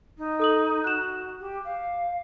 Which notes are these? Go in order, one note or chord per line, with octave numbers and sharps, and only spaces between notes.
D#4
A4 D#6 F#7
F#4 F#6 E7
G4
F5